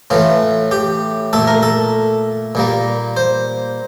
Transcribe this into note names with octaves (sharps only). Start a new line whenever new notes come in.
A2 E3 A3 F4
G4
A#2 A3 A4
A#4
A4
A#2 G3 A#3
C5